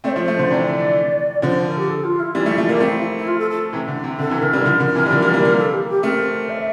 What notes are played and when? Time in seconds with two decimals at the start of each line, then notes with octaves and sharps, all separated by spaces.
0.04 A3 C4 D5
0.08 C5
0.16 F3 A3
0.28 F3 A3
0.39 D3
0.50 C3 E3 D5
1.42 D3 F3 C5
1.66 A#4
1.77 G4
1.89 A4
2.03 F4
2.19 E4
2.35 E3 G3
2.46 F3 A3
2.58 F3 A3
2.69 G3 A#3
2.80 A3 C4
3.16 E4
3.27 F4
3.39 A4
3.50 A4
3.73 C3 E3
3.88 D3
4.04 C3
4.19 D3 A4
4.30 C3 E3
4.42 D3 A#4
4.53 E3 G3
4.65 D3 F3
4.80 D3 F3
4.95 C3 E3
5.06 G3
5.11 D3 F3
5.22 E3 G3
5.34 G3 A#3
5.45 G3 A#3
5.57 A4
5.73 G4
5.88 G4
6.03 A3 C4 A#4
6.49 E5